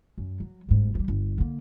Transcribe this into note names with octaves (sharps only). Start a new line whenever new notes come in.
F#2
F#3
G1 G#2
F3 G3
G1
D3 A#3